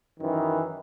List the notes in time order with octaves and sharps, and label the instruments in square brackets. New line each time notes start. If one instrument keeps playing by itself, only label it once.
[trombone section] F#2 D#3 E3